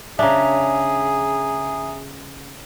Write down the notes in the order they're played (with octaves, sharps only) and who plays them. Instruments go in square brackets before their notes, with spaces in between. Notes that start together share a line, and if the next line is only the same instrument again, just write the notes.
[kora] C#3 D4 [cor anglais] G#4 [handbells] E5 A#5